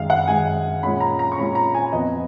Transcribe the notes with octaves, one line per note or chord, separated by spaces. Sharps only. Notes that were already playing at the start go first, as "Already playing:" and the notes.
Already playing: F#2 D#3 G#3 F5
F#5
F#2 D#3 G#3 G#5
A#2 G#3 C#4 B5
A#5
A#5
C#6
A#2 G#3 C#4 B5
A#5
G#5
F2 F3 B3 D#5